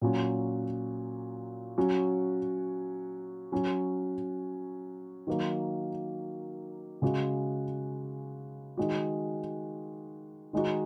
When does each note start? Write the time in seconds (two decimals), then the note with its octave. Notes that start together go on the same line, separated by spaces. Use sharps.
0.01 A#2 F#3 C#4 F#4
1.78 F#3 C#4 F#4
3.52 F#3 C#4 F#4
5.27 D#3 F#3 A#3
7.02 C#3 G#3 F#4
8.77 D#3 G#3 F#4
10.53 D#3 G#3 D#4 F#4